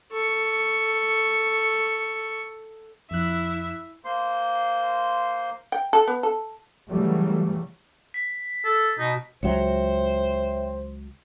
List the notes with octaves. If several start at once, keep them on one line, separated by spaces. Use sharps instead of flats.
A4 C#6
F2 E4 E5 F#6
A#3 C5 C6
G5
A4
B3
A4
C#3 E3 F#3 G3 A3
B6
A4
B2 D#4
C#2 F#3 C5 C#5 E5 G5